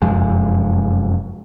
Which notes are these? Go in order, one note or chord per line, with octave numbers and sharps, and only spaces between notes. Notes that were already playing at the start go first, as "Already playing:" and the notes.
F1 F#2 F3 G#3